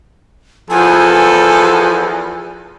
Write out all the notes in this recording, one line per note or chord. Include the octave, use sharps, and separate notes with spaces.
E2 F3 A4 G#5